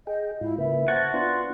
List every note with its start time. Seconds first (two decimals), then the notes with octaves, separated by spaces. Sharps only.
0.07 G#4 D#5 G5
0.41 G#2 E4 F4
0.58 C#3 A#3 B4 E5
0.88 F#4 C5 F#5 A5 G#6
1.14 B3 D4 F4 C6